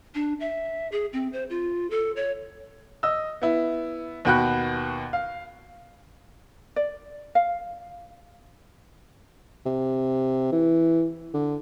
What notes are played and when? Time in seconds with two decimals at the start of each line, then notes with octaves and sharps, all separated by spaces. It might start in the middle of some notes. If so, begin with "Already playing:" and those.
0.15 D4
0.40 E5
0.92 G#4
1.13 C4
1.33 C5
1.50 F4
1.90 A4
2.16 C#5
3.03 D#5 E6
3.42 B3 E4
4.25 D#2 B2 F#4 G5 B5 F#6
5.13 F5
6.76 D5
7.35 F5
9.66 C3
10.52 E3
11.34 D3